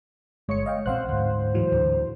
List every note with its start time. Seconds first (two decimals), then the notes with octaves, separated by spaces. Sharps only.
0.49 G1 G#3 C#5 C#7
0.66 D#5 F5 G5
0.86 A#1 F3 C4 C5 F5 F#5 F#6
1.09 D2 G#2
1.54 A2 E3 F#3
1.72 D2 D3